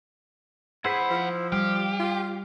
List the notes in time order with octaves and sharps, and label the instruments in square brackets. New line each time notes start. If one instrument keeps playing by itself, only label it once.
[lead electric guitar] F2 F#5 [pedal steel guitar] E4 C5 B5 [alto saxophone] G#4
[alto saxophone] F3
[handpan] G3 [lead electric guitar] G4 [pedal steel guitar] F5
[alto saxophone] F4